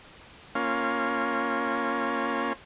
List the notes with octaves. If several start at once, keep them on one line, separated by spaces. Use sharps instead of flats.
A#3 C#4 F4